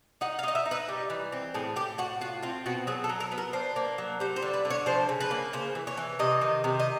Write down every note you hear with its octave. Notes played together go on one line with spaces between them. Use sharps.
D#4 F#5
F5
D#4 D#5
E5
D#4
B4
G3
E3
C4
A2 G#4
A2 G4
A2 F#4
F4 F#4
C4 F4
B2 F#4
F#3 G#4
A4
F#3
A#4
B3
A#4
D4 C5
A#3
F#3
G3 C5
C5
D3
B4
D3
C#5
F3 C5
C#3
B4
A#3
C#3 C5
E3
C#5
E3
C3 D#5
D#3
C3
D#5